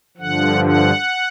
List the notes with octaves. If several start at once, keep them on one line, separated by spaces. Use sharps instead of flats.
G2 D3 F3 F#5
F#5